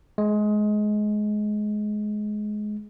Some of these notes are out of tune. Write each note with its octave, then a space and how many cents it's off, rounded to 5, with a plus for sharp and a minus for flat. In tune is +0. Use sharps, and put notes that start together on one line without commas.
G#3 +20